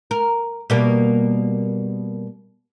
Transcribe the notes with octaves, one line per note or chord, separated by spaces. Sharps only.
A#4
B2 G3 A#3